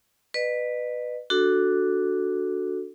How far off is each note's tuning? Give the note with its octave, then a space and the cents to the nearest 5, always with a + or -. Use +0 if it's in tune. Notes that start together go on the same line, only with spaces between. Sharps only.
B4 +0 D#5 -40
D4 +0 F#4 +0 A4 +0